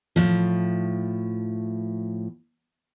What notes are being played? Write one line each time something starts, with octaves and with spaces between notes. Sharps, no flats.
A2 F3